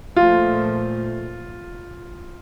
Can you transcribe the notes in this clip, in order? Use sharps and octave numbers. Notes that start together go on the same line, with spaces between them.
A#2 F3 A3 F4